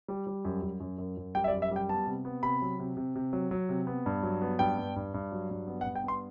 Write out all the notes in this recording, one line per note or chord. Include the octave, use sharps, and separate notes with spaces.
G3
G3
F#2
F#2
F#2
F#2
F#2
G3 G5
E5
D5
F#2
E5
G3 G5
B3 A5
C3
B3
C3 B5
F#3
C3
C3
C3
F#3
F#3
C3
B3
G2
F#3
B3
G2 G5
G2
G2
G2
F#3
G2
B3
F#5
G2
G5
B3 C6